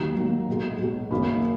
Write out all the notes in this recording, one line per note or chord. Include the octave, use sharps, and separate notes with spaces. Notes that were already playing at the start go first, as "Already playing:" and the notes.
Already playing: D#2 D#3 F#3 A#3 A#5
D#2 D#3 F#3 A#3
B1 B2 G#3
B1 B2 G#3
F#1 F#2 D#3 A#3 B5